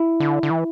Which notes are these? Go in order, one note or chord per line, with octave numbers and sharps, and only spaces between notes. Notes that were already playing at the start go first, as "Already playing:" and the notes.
Already playing: E4
D3
D3
E3